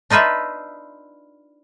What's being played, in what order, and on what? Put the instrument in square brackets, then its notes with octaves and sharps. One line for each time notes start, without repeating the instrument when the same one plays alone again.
[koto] D4 D#4 F4 B4 E5